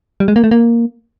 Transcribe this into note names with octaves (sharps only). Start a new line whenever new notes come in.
G3
G#3
A#3
A3
A#3